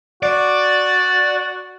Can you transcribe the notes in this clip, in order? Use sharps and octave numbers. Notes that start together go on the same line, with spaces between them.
F#4 D5